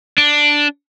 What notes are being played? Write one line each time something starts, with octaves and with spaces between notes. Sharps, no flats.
D4